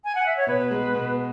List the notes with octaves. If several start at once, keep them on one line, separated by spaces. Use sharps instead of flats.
G#5
F#5
E5
C#5
B2 B4
G#3
B2